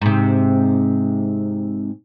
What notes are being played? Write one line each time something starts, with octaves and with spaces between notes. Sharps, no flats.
G#2 C3